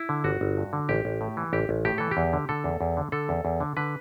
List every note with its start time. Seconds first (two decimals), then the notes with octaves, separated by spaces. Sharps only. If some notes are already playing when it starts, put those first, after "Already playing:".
Already playing: E4
0.09 D3
0.24 G1 F#4
0.41 G1
0.57 G2
0.73 D3
0.89 A1 G4
1.05 A1
1.21 A2
1.37 E3
1.53 A1 G4
1.69 A1
1.85 A2 G4
1.98 E3 A4
2.11 G4
2.17 E2
2.33 D3
2.49 D3 A4
2.64 E2
2.81 E2
2.97 D3
3.12 D3 A4
3.29 E2
3.45 E2
3.60 D3
3.77 D3 B4